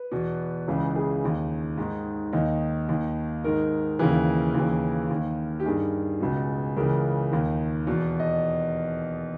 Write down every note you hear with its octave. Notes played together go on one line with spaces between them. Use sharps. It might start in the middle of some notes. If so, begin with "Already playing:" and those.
Already playing: B4
E2 B2
C#2 C#3 E3
G#4
D#2 D#3
G#2 D#3
D#2 D#3 D#4
D#2 D#3
G#2 D#3 A#4
D#2 C#3 E3
D#2 C#3 E3
D#2 D#3
G4
G2 D#3 G#4
C#2 B2
C#2 C#3 E3 A#4
D#2 D#3
E2 B2
D#5